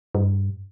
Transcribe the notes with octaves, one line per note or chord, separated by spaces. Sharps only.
G2